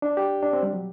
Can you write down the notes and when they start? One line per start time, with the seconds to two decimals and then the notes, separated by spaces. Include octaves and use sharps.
0.02 D4
0.17 G4
0.42 D4
0.53 C4
0.63 G3
0.73 F#3